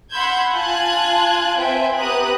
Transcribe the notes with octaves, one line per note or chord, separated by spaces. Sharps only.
F#5 B5 C6 E6 G6 G#6
F4 G#5 A5 F#6 G#6
C4 B4 C5 E5 G5 G#5
B3 G4 B4 A#5 D#6 F#6